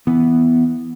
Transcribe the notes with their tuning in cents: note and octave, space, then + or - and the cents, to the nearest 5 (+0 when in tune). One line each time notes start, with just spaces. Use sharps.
E3 +0 B3 +0